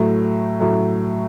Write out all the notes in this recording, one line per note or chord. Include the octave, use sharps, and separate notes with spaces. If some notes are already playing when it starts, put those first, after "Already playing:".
Already playing: A2 F#3 A3
A2 F#3 A3